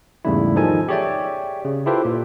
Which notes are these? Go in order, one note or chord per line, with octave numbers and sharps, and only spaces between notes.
E2 G#2 C#3 G3 A3 E4
D#3 F3 D#4 A4 G#5
G4 G#4 C#5 D5 E5 G5
C#3
E4 F4 G4 A4 B4 C5
A#2